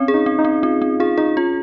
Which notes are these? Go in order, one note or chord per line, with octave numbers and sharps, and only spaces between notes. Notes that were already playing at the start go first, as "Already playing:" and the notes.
Already playing: C4 C#4
G#4
D#4
C4
D#4
C4
C4 F4
C4
F4 G#4
D#4 G#4
C#4 F4